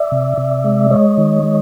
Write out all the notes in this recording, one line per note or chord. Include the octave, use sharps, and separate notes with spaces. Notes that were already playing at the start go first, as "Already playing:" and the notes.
Already playing: D5 E5
C3
C3
G#3
G#3 C#5 D#5
D#3
G#3